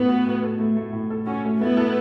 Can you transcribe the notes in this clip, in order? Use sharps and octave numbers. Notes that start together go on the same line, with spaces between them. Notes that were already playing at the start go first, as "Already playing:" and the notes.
Already playing: A2 B3
F#4
A2
A4
A3
A3
A2
A4
C#4 F#4
A3
A3 B3 E4
A4